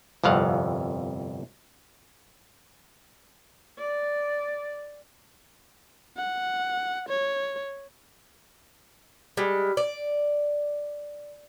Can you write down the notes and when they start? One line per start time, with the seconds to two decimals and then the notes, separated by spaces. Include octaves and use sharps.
0.24 G1 C2 F2 F5 F#5
3.78 D5
6.17 F#5
7.09 C#5
9.37 G3 G#3
9.77 D5